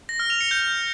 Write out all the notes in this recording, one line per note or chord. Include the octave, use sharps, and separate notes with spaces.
A#6
F6
F7
C#7
G6